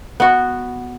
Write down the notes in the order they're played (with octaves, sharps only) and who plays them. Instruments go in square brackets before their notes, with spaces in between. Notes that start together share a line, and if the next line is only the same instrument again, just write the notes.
[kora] B3 F#4